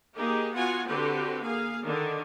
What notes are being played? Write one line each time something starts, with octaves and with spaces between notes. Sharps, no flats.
A#3 D#4 G4 G#4
B3 F4 F#4 F#5 G#5
D3 C4 F#4 G4 B4
A#3 G#4 F5
D3 D#3 D4